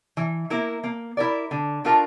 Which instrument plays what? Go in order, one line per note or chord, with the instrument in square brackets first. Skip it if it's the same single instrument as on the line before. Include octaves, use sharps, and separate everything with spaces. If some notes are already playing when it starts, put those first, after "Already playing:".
[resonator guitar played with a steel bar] E3
A#3 E4 A#4
A#3
E4 A#4 D5
D3
A3 D4 F4 A#4